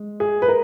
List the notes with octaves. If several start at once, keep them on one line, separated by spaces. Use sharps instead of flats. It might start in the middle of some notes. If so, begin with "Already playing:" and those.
Already playing: G#3
G#4
B4
A#4